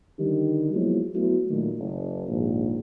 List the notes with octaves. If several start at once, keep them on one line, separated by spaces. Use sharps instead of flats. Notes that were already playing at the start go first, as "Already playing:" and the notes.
D3 D#3 G3 D#4 G4
F3 F#3 G#3 A#3 B3 E4
F#3 A3 B3 E4 F#4
A#2 D#3 F#3 A3
F#1
A#1 D#2 G#2